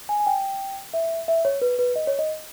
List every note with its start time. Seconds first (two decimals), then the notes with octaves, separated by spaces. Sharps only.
0.09 G#5
0.20 G#5
0.27 G5
0.94 E5
1.28 E5
1.45 C#5
1.62 B4
1.79 B4
1.96 D#5
2.07 C#5
2.19 D#5